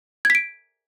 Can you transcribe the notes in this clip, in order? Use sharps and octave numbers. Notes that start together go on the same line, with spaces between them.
G#6 B6 D7